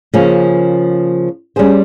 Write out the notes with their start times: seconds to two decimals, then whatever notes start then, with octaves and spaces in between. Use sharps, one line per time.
0.14 C#3 F3 A#3 C#4
1.56 G3 C#4 G#4 C5